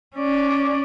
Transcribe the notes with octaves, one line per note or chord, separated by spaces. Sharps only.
C#4 D5